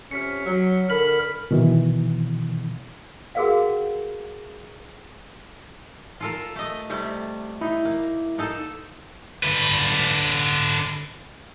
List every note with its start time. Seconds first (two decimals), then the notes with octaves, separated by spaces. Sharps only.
0.11 F2 C3 C#4 F6 B6 C#7
0.46 F#3
0.90 D3 A#4 B5 B6 F#7
1.51 B2 D#3 E3
3.35 F#4 G#4 A#4 B4 F5 F#5
6.20 F4 A4 A#4
6.56 A3 D#5
6.89 C3 G3 A3
7.61 D#4 E4
7.85 A#3
8.38 A#3 D#4 A4
9.43 D3 B4